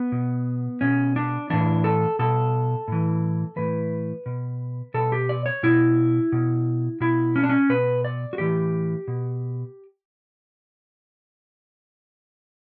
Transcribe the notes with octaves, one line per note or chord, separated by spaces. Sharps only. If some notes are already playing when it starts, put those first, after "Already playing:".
Already playing: B3
B2
B2 C#4
D4
A2 E3 D4
A4
B2 A4
A2 E3
A2 E3 B4
B2
B2 A4
G4
D5
C#5
B2 E4
B2
B2 E4
C#4
D4
C#4
B2 B4
D5
F#4
A2 E3 G4
B2